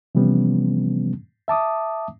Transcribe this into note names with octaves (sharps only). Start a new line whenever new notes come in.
C3 E3 F3 G3 B3 C#4
E5 A5 D6 D#6